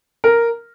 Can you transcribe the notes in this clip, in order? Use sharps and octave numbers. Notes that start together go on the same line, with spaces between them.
A#4